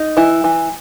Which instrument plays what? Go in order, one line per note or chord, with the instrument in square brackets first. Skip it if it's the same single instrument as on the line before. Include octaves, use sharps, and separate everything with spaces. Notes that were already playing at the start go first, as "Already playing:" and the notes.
Already playing: [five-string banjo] D#4
E3 E4
E3